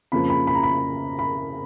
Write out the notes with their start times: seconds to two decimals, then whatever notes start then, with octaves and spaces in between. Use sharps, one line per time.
0.12 F2 C#3 F3 A#3 B5
0.30 B5
0.47 B5
0.55 A#5
0.63 B5
1.19 B5